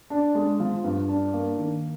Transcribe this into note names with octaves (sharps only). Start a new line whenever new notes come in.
D4
G#3
F3
G2
D4
A#3
D#3